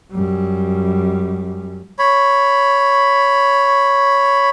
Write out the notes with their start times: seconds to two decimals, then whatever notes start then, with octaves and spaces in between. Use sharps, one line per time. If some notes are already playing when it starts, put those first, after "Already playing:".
0.13 F#2 G3
1.99 C#5 B5